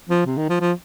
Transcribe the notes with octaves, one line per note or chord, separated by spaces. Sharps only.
F3
C3
D#3
F3
F3